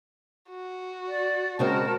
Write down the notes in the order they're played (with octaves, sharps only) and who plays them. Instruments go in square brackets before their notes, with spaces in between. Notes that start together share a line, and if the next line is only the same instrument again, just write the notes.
[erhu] F#4
[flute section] D5
[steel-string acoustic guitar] C#3 G#3 C4 [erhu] F#4 [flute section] A#4 A5